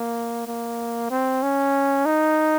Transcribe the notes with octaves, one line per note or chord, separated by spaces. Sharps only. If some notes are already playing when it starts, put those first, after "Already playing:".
Already playing: A#3
A#3
C4
C#4
D#4